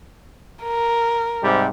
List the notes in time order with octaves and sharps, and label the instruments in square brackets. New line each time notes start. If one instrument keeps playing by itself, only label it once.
[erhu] A#4
[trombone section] G#2 C3 G3